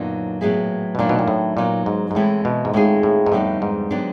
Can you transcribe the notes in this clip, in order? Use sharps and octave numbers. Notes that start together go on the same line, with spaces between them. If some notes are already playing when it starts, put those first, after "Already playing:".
Already playing: F#2 A#2 D3 F#3 B3 D#4
A2 F#3 B3 E4 G#4
B2
A#2 D#3 F#3 A3 D4
B2
A#2
A2
A#2 F#3 B3 D#4
G#2
G#2
A2 E3 G#3 C4 E4 A4
B2
G#2
A2 D#3 G#3 C4 F4 G#4
A2
G#2
F2 A2 D3 G3 B3 D#4
G#2
D3 F#3 B3 D4 G4